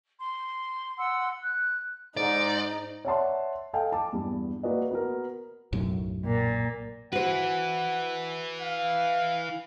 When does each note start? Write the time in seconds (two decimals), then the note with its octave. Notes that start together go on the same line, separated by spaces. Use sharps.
0.18 C6
0.96 F#5 C6 E6
1.40 F#6
2.17 G#2 D#4 D5
3.05 C#5 D5 E5 F#5 A5 C6
3.73 A4 D#5 F5 G5 G#5
3.92 A5 D6
4.12 E2 G2
4.63 A#3 F#4 B4 D5 D#5
4.91 B3 F#4 A#4
5.73 B1 F#2 A2
6.26 A#2
7.12 E4 F#4 B4 C5 F#5
8.61 F5